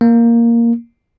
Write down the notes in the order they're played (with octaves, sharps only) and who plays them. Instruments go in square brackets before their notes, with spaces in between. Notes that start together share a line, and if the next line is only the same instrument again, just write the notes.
[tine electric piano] A#3